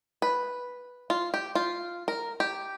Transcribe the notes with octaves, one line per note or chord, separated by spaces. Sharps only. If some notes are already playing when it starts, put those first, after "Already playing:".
B4
F4
G4
F4
A#4
G4